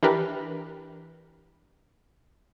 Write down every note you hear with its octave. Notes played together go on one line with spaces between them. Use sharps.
E3 D4 G4 A#4 B4